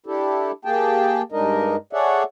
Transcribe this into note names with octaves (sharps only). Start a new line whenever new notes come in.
D4 E4 G4 A4
A#3 G4 G#4 G5 A5
G2 G#3 D4 D#4 A#4 D#5
G#4 A4 C#5 D5 E5 F#5